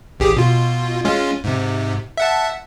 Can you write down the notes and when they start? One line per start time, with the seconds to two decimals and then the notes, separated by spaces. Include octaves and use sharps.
0.20 A1 G4 G#4
0.37 B2 F4
1.05 G#3 C#4 F4
1.44 G#2 C3
2.17 E5 F#5 A5